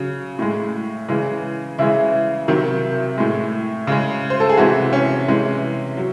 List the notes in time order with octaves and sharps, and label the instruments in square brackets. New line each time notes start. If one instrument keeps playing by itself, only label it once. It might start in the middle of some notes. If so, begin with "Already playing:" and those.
Already playing: [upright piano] C#3 F#3
A2 G#3
C#3 E3 G#3
C#3 E3 G#3 E4
C3 D#3 F#3
A2 G#3
C#3 G#3
C5
A4
G#4
C3 E3 G#3 F#4
C#4
C3 E3 G#3
F#3